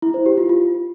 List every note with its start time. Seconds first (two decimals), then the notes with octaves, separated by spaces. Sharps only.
0.02 E4
0.14 C5
0.26 G4
0.38 F4
0.49 F4